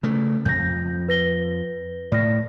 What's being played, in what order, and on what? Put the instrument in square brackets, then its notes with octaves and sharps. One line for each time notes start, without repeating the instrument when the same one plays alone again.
[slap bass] C#3 A3
[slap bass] F2 [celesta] G6 A#6
[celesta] B4 A#6 G7
[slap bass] A2 [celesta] D5 F6 A#6